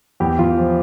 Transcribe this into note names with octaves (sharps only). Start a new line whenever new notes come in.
E2 G4
E2 F4
F3